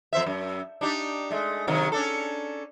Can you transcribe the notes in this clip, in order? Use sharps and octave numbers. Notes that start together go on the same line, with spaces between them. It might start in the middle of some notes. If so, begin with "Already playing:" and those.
F2 C5 E5
F#2
D4 D#4 G4
G#3 A3
C3 D#3 F#3
C#4 D4 A4